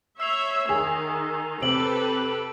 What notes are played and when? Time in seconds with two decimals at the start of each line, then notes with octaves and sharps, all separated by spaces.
0.20 C#5 E5 E6 C7 F7
0.69 D#3 G#4
1.62 C3 G4 A4 B4 D7 F#7